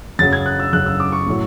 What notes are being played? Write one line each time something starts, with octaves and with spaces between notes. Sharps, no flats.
F#2 C#3 F#3 A6
G#6
F#6
E6
F#2 C#3 F#3 F#6
E6
D6
C#6
A2 F#3